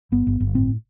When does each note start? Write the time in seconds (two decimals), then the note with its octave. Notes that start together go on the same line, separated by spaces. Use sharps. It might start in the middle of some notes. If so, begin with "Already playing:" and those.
0.12 G1 B3
0.27 G1
0.40 G1
0.54 A2 C4